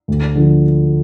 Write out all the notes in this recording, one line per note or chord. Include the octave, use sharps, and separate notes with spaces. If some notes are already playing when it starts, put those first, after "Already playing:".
D2
D3 F3